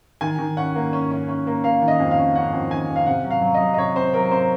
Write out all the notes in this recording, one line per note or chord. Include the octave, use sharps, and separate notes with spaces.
D#3 G#5
D#3
C#4 F#5
A#3
C#4
C#4
C#4
A#3
A#3 F5
D#3
D#5
F2
F5
C#4
C#4 F#5
F2
D#3 G#5
F2
F5
C3 F#5
F#3
F5
F#3
D#5
F#3
D#5
C3 C#5
C4 C5
F#3 A#4
C4 C5